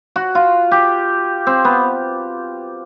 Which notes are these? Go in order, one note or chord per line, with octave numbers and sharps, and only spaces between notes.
F#4
F4
G4
C4
B3